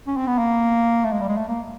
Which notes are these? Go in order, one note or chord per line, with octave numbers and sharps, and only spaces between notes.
C#4
C4
B3
A#3
A3
G#3
G3
G#3
A3
A#3